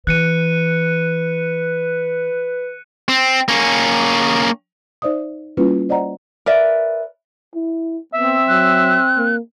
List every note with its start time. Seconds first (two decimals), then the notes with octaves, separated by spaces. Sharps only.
0.07 E3 B4 F#6 C#7 D#7
3.08 C4
3.48 A#3 C#4
5.02 D#4 C5 D5 E5 D#6
5.57 G3 A#3 C#4 E4 F4 B4
5.89 C5 D5 D#5 F#5 A#5
6.46 A#4 B4 D5 E5
7.55 E4
8.14 B3 C4 E5
8.48 F#3 F#6
9.17 A#3